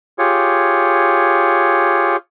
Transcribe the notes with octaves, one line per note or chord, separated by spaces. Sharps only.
F4 G4 G#4 C#5